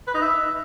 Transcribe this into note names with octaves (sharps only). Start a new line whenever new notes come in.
B4
D#4
E5